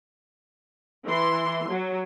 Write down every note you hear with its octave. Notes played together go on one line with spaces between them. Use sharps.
E3 C6
F#3